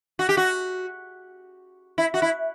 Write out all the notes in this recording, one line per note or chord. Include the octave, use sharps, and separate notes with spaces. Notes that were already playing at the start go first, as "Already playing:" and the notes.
F#4
G4
F#4
E4
F#4
E4